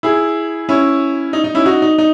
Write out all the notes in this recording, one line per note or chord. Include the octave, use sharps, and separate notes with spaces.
E4 G#4
C#4 E4
D#4
D#4
C#4 E4
D#4 F#4
D#4
D#4